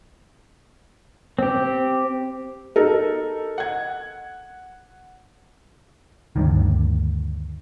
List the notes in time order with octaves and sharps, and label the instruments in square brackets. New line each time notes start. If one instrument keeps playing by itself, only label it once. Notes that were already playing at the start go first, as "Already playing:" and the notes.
[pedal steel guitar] C4 G4
[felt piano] D#4 A4 A#4
F#5 G#6
[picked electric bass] D2 G2 D#3